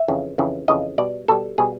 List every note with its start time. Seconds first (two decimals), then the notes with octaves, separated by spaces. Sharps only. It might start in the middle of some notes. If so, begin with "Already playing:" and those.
Already playing: E5
0.08 F2 C#3 E3
0.38 F2 C#3 E3
0.68 F2 C#3 E3 D#5
0.98 B2 G3 D5
1.28 B2 G3 A4
1.58 B2 G3 G#4